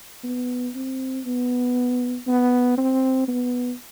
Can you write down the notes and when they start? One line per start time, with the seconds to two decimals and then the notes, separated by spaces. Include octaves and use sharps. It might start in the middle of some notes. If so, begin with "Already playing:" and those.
0.24 B3
0.75 C4
1.25 B3
2.27 B3
2.77 C4
3.28 B3